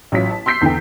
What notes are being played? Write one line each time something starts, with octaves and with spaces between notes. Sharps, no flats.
A1 F#3 F4 C#5 B6
A5
C6 E6 G6 B6 C7
E2 D3 E3 G5